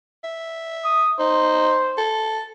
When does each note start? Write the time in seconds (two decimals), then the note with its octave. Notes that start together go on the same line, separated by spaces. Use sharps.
0.24 E5
0.84 D#6
1.19 D#4 C5
1.98 A4